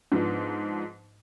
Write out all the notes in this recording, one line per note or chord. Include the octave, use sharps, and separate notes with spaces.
G#2 F3 B3 D4 D#4